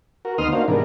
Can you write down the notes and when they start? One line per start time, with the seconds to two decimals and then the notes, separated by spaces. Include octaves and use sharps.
0.25 F#4 A#4
0.38 D2 B3 D#4 C6 D#6 F6
0.53 A#3 D4 D#4 F#4 C5 F5
0.68 G#2 C3 E3 B3 D4 A#4